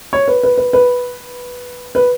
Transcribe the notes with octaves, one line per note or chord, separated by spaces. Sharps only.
C#5
B4
B4
B4
B4
B4